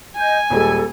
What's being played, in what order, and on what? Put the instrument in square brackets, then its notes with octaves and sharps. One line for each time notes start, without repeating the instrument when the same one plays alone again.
[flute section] D#5 G6 [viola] G#5
[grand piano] D#1 G3 G#3 [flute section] A4